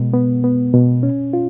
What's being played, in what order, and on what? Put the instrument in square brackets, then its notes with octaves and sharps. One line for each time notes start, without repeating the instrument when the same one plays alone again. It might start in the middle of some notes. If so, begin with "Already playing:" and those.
Already playing: [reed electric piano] B2 G#3
B3
B3
B2
C#4
F4